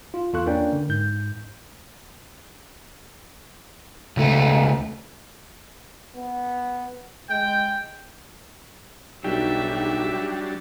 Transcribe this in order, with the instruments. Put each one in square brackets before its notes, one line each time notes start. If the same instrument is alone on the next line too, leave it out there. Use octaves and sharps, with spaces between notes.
[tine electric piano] F4
E2 F4 A4 C#6 F#6
A#3 C#4 D4 A#4 D5 G5
D3
G#2 G6
[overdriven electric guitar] C#2 A3
[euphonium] B3
[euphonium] G#3 [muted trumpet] G5
[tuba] B1 [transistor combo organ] F#3 G3 D4 [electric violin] D#4 E5 [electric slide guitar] G4